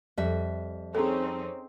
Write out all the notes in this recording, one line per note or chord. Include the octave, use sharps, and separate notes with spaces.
F2 G3 E5
C4 C#4 D#4 G#4 A4